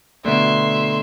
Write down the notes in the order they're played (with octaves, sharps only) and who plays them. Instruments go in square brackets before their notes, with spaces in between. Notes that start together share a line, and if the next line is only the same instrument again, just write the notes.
[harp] D2 B2 [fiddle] E5 C6